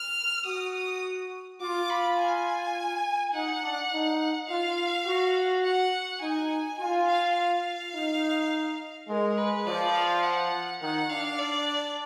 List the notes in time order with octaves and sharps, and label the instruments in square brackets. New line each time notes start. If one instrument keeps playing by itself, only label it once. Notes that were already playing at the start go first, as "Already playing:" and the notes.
Already playing: [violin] F6
[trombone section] F#4 [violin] D#6
[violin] D#6
[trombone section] F4 [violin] D6
[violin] B5
G#5
[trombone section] D#4 [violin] F#5
[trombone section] D4
D#4
[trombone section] F4 [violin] F5
[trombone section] F#4
[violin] F#5
[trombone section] D#4 [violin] G#5
[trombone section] F4 [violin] G#5
[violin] F5
F5
[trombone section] D#4
[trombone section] G#3 [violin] A#4
[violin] B4
[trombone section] F3 [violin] D5
[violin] F5
F#5
[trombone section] D#3 [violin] F#5
[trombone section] D4 [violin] F5
[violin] D5